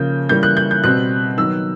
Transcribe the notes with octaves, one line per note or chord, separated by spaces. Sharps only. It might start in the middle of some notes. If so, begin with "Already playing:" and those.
Already playing: C#3 F3 A#3 G6
C#3 E3 G3 A#3 G6
F#6
G6
G6
B2 G3 C4 F#6
D#3 F#3 B3 E6